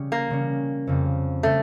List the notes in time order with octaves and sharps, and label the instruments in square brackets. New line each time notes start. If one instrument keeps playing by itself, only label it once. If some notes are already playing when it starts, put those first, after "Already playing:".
Already playing: [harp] C#3 G3 C#4
[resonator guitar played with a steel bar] A#3
[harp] C#3 G3 C#4
F2 C#3 G3
[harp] C#3 G3 [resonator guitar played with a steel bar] A3